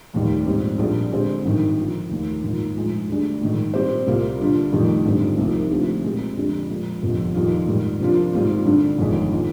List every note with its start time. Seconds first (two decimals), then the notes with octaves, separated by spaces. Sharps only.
0.13 F1 D#2 D#3 G3
0.46 A#1 G#2 G3 C4
0.78 A#1 A#2 G3 D4 G#4
1.12 D3 G#3 C4 G4 C5
1.44 G#1 G2 D#3
1.77 D3 F3 A#3
2.10 F1 D#2 D#3 A#3
2.43 G#2 D#3 A#3 F4
2.75 A#1 G#2 F3 G#3
3.09 D2 D3 G3 D4 G#4
3.41 A#1 G#2 D#3
3.74 A#2 G3 C4 G4 C5
4.07 C2 C3 G3 A#3 F4
4.40 D3 G3 D4 F4
4.72 F1 F2 D#3 G3
5.05 G#1 G2 D3 G3 C4
5.38 C2 C3 F3 A#3 D#4
5.71 D2 D3 F3 C4 G4
6.03 A#2 G#3 C4 G4
6.36 F2 D3 G#3 D4 G4
6.69 A#2 F3 G#3
7.02 G1 F2 C3 F3
7.35 F2 D#3 G3 A#3 F4
7.67 G#2 D#3 G3
8.00 C3 F3 A#3 D4 F4
8.33 G#1 G#2 G3 C4 F4
8.66 G2 D3 G3 D4
8.98 G1 F2 D#3 G#3
9.31 D#3 A#3 F4